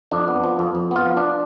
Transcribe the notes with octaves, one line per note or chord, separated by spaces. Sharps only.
F2 D4
B3
F3
F2
F2
B3 F4
F3
D4